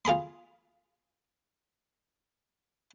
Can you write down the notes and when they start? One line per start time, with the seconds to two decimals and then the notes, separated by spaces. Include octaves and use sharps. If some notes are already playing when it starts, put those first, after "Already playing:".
0.05 F4 G#4 B5 C6